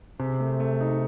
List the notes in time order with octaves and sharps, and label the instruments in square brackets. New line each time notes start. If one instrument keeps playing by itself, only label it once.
[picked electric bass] C3 [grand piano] G#4
[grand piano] A3
A3
D#4